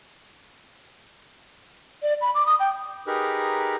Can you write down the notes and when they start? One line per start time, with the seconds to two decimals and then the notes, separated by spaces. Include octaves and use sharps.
2.02 D5
2.21 B5
2.35 D6
2.46 D#6
2.60 G5
3.07 D#4 G4 G#4 A#4 B4